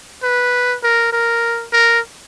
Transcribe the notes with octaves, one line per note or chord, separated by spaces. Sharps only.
B4
A#4
A#4
A#4